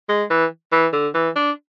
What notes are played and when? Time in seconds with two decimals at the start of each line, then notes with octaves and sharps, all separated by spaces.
0.09 G#3
0.30 E3
0.72 E3
0.93 D3
1.14 E3
1.36 D4